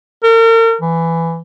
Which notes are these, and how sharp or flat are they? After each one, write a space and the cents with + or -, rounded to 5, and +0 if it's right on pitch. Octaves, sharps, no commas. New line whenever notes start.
A#4 -40
E3 +10